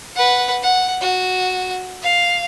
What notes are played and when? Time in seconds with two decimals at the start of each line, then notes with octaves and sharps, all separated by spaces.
0.15 B4 F#5
0.62 F#5
1.01 F#4
2.02 F5